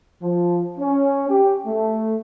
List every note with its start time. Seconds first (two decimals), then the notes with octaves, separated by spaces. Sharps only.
0.22 F3
0.78 C#4
1.28 G4
1.66 A3